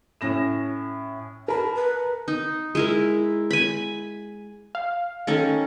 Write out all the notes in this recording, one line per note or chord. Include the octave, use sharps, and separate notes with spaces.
A2 C#4 A#6 E7
A#4 A5 B5
B4
D#4
G#3 E4 A#4
G#5 B5
F5
D#3 C#4 A4